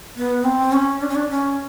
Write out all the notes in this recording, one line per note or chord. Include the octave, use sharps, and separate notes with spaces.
B3
C4
C#4
D4
C#4
D4
C#4